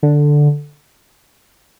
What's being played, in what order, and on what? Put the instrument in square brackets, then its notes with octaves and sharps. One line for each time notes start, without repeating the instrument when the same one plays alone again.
[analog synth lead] D3